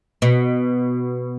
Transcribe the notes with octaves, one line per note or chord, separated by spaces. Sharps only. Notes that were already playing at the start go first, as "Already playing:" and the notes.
B2